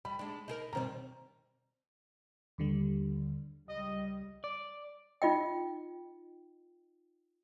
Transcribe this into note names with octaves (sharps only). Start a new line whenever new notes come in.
G3 B5
G#3 D4
D#4 G#4 A#4
B2 D#3 G3 C4 A#5
D#2 D3 G3
C#2 G3 D#5
D5
D#4 F4 D#5 G5